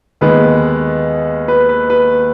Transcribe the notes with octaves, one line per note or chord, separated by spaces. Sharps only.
D#2 D#3 G#3 B3 B4
B4
B4
B4